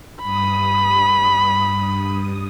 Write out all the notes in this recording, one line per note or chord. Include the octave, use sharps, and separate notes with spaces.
G2 B5 D#6